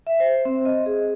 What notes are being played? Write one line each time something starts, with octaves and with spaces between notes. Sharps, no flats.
E5
C5
C4
D#5
G#4